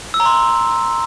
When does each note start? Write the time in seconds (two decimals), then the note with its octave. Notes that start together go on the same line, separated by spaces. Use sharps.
0.14 E6
0.20 A#5
0.26 C6